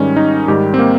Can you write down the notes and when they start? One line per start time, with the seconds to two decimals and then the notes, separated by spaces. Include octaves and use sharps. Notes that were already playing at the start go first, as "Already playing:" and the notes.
Already playing: G#2 D#3 G3 C#4
0.16 D#4
0.48 G#2 D#3 G3 G4
0.74 C4
0.79 A#3